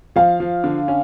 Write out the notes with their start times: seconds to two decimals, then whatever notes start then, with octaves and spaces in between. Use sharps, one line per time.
0.16 F3 F5
0.40 F3
0.64 D3
0.88 C#4